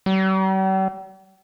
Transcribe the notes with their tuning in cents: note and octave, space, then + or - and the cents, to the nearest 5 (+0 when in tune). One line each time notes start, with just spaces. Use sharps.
G3 -45